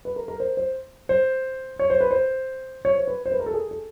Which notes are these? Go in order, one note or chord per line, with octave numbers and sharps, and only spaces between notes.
B4
A#4
A#4
C5
C5
C5
C#5
C5
B4
C5
C#5
C5
B4
C5
B4
A#4
A4
G#4
A4